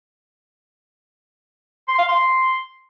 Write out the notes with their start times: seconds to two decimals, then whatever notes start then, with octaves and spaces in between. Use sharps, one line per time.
1.88 C6
1.98 F5
2.08 C6